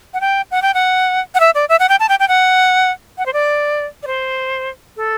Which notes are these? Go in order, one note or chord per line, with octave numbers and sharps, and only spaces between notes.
F#5
G5
F#5
G5
F#5
F#5
E5
D5
E5
F#5
G5
A5
G5
G5
F#5
F#5
C5
D5
D5
C5
A4